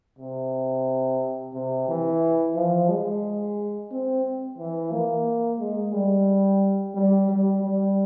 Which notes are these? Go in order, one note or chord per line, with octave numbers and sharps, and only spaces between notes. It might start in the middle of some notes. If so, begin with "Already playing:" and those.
C3
C3
E3
F3
G#3
C4
E3
A#3
G#3
G3
G3
G3
G3